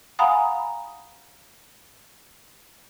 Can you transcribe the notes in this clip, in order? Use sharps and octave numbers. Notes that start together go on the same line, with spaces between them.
F5 F#5 G#5 A#5 B5 D#6